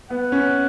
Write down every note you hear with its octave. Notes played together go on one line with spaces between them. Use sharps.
B3 F#5
C#4